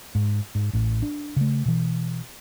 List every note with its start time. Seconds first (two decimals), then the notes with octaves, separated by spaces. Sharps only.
0.15 G#2
0.55 G#2
0.73 A1 A2
1.03 D4
1.36 C#3 A3
1.66 B2 E3